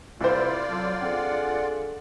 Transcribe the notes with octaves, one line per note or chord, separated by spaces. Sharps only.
C2 E4 F4 C5 D5
F#3 A4
C4 D4 G#4 A4 F#5